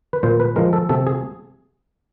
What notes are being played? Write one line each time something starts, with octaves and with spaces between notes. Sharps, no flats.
B4
A#2 C5
B4
F3 G#3 A#4
A4
C3 A4
G#4